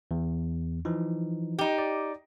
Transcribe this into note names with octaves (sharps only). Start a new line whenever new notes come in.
E2
E3 F3 D#4
D#4 G4
D5